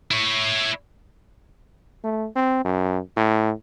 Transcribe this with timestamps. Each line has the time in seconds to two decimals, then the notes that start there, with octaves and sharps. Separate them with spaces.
0.11 E4 C#5
2.04 A3
2.36 C4
2.65 F#2
3.16 A2